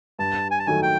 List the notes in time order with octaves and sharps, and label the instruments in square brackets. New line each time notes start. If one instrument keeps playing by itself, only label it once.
[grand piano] G2 [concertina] A5
[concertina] G#5
A5
[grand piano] D#3 F#3 A3 [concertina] G#5
[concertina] G5